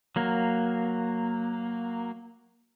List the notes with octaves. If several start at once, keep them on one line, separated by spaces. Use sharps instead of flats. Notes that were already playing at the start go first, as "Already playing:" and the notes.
F#3 A#3